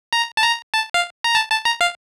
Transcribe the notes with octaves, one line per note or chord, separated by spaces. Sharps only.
A#5
A5
A#5
A5
F5
A#5
A5
A5
A#5
F5